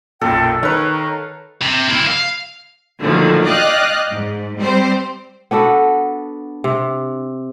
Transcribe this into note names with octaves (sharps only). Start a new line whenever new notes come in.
B1 F#2 A#2 A4 G5
D#3 B4 C#5 F5 A#5
C3
A#3 E4
F5
A#2 D3 D#3 F3 F#3 A3
D5 D#5 F5 G5 F6 F#6
G#2
G3 C4 G4 C5
B3 D4 F#4 A4
C3